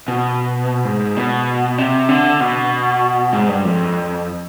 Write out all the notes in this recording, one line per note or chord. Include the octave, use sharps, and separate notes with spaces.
B2
G#2
B2
C3
D3
B2
G#2
G2
F2